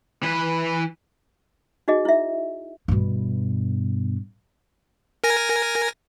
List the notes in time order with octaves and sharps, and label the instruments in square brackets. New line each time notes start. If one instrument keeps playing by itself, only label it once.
[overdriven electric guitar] E3 B4
[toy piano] D#4 F#4 G#4 D#5
E4 E5
[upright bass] G2 B2
[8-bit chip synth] A#4 G#5 A#6